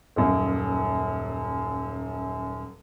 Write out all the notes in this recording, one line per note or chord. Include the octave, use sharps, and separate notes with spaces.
D#1 F#2 A#3